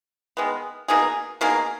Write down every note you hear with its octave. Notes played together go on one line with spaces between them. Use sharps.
D#3 G#3 B3
B2 A#3 D#4 G#4
B2 A#3 D#4 G#4